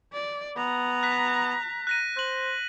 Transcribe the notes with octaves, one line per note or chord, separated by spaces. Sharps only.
D5
B3 A#5
F#6 B6
F#6 A#6 D#7
C5 F#6 F#7